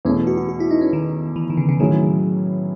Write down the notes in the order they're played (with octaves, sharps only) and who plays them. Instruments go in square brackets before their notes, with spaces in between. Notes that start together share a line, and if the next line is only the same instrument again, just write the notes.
[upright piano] E2 B2 A3 [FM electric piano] C#4
[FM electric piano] F#4
F#4
F#4
E4
D#4
C#4
D#3
E3
D#3
C#3
C#3
[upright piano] A2 F#3 C#4 E4 G#4 [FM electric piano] D#3